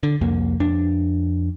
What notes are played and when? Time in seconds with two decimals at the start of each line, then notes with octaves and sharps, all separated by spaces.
0.03 D3
0.21 C2 F2 A#3
0.60 F2 D4